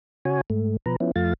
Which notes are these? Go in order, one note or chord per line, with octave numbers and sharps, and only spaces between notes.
C#3 F#4 C#5 G#5
G#2 A3
B2 F3 B4 A#5
F3 B3 C#4 E4
F2 F3 A3 F4 F5 A6